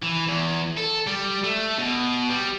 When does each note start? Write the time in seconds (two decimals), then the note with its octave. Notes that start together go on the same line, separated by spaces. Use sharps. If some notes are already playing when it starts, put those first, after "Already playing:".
0.03 E3
0.28 E2
0.78 A4
1.07 G3
1.43 A3
1.78 B2
2.29 G3